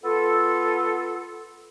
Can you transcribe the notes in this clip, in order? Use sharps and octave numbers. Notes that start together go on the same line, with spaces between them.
B3 F4 A4